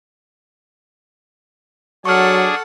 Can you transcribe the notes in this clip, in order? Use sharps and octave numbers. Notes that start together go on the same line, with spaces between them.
F#3 D4 G#4 A4 F#5 C#6 F6